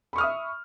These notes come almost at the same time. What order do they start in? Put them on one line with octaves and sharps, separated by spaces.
B5 C#6 F6 D#6 E5